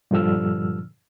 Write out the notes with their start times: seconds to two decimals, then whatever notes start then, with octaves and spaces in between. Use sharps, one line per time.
0.11 G2 A#2 D3 F3 E6 F6